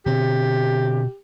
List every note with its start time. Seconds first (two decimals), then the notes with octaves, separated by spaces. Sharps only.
0.06 B2 D3 C4 G4